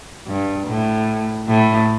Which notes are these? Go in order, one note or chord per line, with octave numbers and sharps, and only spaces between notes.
G2
A2
A2